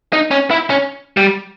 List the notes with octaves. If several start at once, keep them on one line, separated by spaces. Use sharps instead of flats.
D#4
C#4
E4
C#4
G3